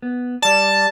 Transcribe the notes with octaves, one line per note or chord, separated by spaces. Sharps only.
B3
G3 D5 A5